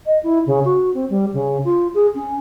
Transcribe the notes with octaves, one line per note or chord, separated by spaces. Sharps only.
D#5
E4
C#3
F#4
C4
G3
C#3
F4
G#4
C#4